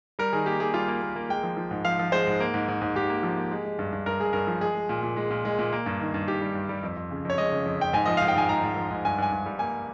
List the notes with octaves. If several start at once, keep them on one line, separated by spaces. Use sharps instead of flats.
G3 A#4
D#3 G#4
A#3 G4
A#3 G#4
G3 F4
A#3
A#3
A#3
G#3 G5
F3
F3
G#2
F3 F5
F3
G#3 C5
G#2
A#3
G#2
G#2
G#2
G#2 G4
A#3
F3
A#3
G#3
G#3
G2
G2
G2 A#4
G#3 G#4
G2 A#4
F3
G#3 G#4
G#3
A#2
A#2
G#3
A#2
G#3
A#2
A#3
G2
D#3
G2
D#3 G4
G3
G2
G3
F2
F2
C#3
F2 C#5
G#3 D#5
C#3
F2
F2 G5
G#2 G#5
F3 D#5
G#2 F5
G5
G#2 G#5
G#2 A#5
G#2
F3
G#2
G2 G#5
G2 G#5
G2
G3
A#3 G#5